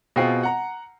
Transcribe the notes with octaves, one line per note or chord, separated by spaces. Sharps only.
B2 C4 F4 G#4 G5 C7
F#5 A#5